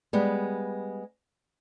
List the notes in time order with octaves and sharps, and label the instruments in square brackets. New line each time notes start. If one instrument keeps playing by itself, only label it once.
[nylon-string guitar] G3 G#3 B3